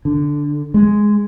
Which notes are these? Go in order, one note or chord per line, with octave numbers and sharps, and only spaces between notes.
D3
G#3